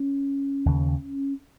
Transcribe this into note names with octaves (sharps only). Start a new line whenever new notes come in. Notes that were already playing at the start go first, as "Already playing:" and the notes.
Already playing: C#4
D#2 C#3